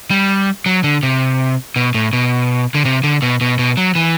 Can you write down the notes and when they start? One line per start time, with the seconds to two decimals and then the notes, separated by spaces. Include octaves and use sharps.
0.11 G3
0.66 F#3
0.84 D3
1.03 C3
1.76 B2
1.94 A2
2.13 B2
2.74 D3
2.85 C3
3.04 D3
3.22 B2
3.41 B2
3.59 B2
3.77 F#3
3.95 E3